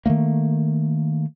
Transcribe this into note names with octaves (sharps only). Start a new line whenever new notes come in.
D#3 F#3 A3 A#3